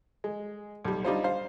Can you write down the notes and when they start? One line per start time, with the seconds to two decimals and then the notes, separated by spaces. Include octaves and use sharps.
0.24 G#3
0.85 B1 G3
1.05 G3 D4 D#4 F4 C5
1.24 C5 F5